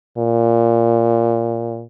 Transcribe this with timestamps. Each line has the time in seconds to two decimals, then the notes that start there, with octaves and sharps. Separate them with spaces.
0.18 A#2